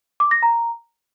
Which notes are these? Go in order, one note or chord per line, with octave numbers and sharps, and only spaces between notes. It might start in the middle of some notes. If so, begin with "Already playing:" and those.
D6
A#6
A#5